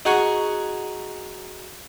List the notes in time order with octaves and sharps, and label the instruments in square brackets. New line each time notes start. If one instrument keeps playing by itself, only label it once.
[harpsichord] D#4 F#4 G#4 F#5 G#5 C#6